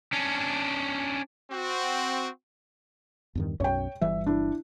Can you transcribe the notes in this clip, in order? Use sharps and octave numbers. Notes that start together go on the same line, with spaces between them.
C#4 D4
C4 F#4
E2 G2 D#3
B1 F#2 C#4 C#5 G5
G1 E3 G3 E5
D4 E4